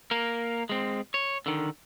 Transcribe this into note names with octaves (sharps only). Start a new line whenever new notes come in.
A#3 A#4
G#3 C4
C#5
D3 D#3